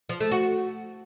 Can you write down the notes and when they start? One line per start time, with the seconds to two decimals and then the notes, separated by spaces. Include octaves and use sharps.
0.09 F3
0.20 A3
0.31 F#4